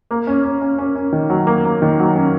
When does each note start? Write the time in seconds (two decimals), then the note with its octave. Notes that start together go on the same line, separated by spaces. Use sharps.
0.11 A#3
0.27 C#4
0.44 C#4
0.62 C#4
0.78 C#4
0.96 C#4
1.12 D#3
1.30 F#3
1.47 A#3
1.65 A#3
1.82 D#3
1.99 F#3
2.16 C#4